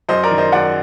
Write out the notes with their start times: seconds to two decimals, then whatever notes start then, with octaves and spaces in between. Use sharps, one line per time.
0.09 F#2 C5 D#5
0.23 A#4 D5
0.31 D#3
0.38 C5 D#5
0.52 F#2 D5 F#5